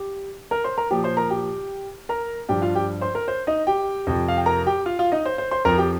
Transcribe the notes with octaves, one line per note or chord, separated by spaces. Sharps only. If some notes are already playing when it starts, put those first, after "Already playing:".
Already playing: G4
A#4 A#5
C5 C6
A#4 A#5
A#2 F3 G4 G5
C5 C6
A#4 A#5
G4 G5
A#4 A#5
G2 F3 G4 G5
F4 F5
G4 G5
C5 C6
A#4
C5
D#4 D#5
G4 G5
F2 C3 F3
F5
G5
A#4 A#5
G4 G5
F4 F5
F4 F5
D#4 D#5
C5
C5
C5 C6
F2 F3 A#4 A#5
G4 G5